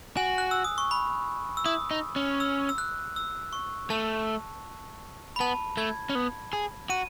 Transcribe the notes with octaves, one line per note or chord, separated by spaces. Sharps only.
F#4 G#5
F#6
E6
D#6
C#6
B5
E6
E4 D#6
D#4
C#4
E6
E6
F#6
E6
C#6
A3 A5
B5
B3 A5
A3 G#6
C#4
B3
G#4
F#4 D#7